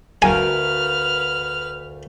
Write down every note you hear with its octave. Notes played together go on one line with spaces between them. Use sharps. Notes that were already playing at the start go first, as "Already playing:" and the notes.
D2 A#4 B4 F5 G#5 F6